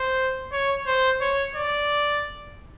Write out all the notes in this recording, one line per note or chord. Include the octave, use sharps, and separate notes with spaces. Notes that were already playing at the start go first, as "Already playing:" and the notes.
Already playing: C5
C#5
C5
C#5
D5